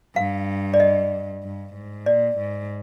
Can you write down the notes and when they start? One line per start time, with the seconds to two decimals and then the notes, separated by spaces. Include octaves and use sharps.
0.16 G2 F5
0.74 D5
0.80 D#5
1.43 G2
1.75 G#2
2.06 A#2 D5
2.39 G#2